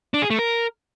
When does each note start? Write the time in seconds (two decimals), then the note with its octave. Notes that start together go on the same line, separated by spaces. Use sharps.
0.14 D4
0.22 G#4
0.30 A3
0.39 A#4